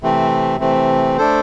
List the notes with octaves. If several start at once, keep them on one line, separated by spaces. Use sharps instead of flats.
C3 E3 A3 C4
C3 E3 A3 C4
A3 D4 A4 C5